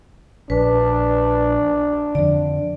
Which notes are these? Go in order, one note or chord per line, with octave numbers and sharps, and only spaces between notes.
A#1 D4 B4
F2 D3 D5